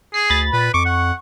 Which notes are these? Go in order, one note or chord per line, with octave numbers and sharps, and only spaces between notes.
G#4 C7
D2 B5 A6
A#2 B4
F2 C#6 D6
F#5